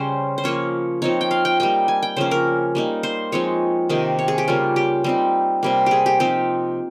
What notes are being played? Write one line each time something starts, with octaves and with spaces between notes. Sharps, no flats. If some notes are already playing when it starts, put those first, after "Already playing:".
Already playing: C#3 G3 C#4 C5
C5
F3 A#3 C#4 C#5
F3 C4 D#4 C#5
G5
F5
G5
G3 A#3 D#4 G5
G#5
G5
C#3 F3 A#3 C#4 C5
A#4
G3 A#3 D#4
C5
F3 G#3 C4 D#4 C#5
C3 D#3 A#3 D#4
C#5
G#4
G4
C#3 G3 A#3 F4
G4
G3 C4 D#4
C3 G3 A#3
G4 G#4
G4
F3 C4 D#4 G4